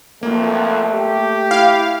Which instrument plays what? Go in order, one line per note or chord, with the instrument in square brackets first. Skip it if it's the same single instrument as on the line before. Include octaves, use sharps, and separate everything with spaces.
[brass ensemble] B1 F2 [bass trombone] A3 [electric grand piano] A#3
[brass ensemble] G4
[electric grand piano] E4 [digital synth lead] F5